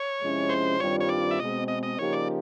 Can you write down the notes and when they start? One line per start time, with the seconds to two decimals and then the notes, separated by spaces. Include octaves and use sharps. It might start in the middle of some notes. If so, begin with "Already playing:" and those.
Already playing: C#5
0.21 C3 F3 G#3 C#4 E4
0.50 C5
0.80 G2 D#3 G3 C4 F4 C#5
1.00 C#5
1.09 D5
1.31 E5
1.39 B2 G#3 C4 D#5
1.68 D#5
1.83 D#5
1.98 C#3 F3 A#3 D#4 G4 C#5
2.13 D5